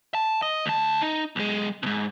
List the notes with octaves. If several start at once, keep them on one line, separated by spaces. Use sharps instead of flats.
A5
D#5
D2 A5
D#4
B1 G#3
G#2 B2